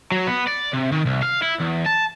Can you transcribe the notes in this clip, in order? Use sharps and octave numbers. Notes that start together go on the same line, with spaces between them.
F#3
B3
D5
C3
D#3
C2
F5
E4
E2
A5